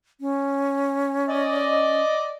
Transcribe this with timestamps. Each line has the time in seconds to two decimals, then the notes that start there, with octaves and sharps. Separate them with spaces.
0.20 C#4
1.28 D5 D#5